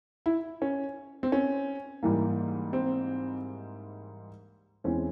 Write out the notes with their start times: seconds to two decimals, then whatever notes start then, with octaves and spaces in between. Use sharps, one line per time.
0.26 E4
0.62 C#4
1.23 C4
1.32 C#4
2.03 G#2 E3 G3 A#3
2.73 C4
4.84 E2 E3 G#3 C4 C#4